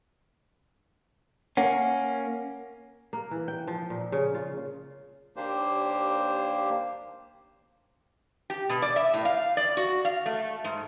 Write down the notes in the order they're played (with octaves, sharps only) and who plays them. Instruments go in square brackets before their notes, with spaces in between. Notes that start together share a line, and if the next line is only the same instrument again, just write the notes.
[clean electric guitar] A#3 C#4 [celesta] F#5
[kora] A#3
E3
G5
F3
A#2
C#3
F4
[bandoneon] D#2 A#3 D4 G4 C5
[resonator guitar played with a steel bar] G4
B2
D5
E5
A2
F5
D5
F#4
F5
A3
G#2